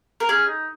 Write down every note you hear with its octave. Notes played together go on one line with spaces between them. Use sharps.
A#4
C#4 G#4
D#4